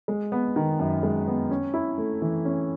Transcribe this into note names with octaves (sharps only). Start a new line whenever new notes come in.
G#3
B3
D#3
F#2
G#3
B3
C#4
E4
A3
E3
C#4